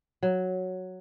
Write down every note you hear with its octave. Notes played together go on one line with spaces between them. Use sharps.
F#3